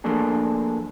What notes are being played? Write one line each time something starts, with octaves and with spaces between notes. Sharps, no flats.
F3 A3 A#3 D4 G#4